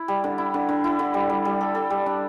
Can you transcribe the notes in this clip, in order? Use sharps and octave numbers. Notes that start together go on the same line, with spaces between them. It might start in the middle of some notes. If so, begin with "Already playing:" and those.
Already playing: E4
G3
D3
E4
D3
D3
E4
D3
G3
G3
G3
A4
A4
G3
D4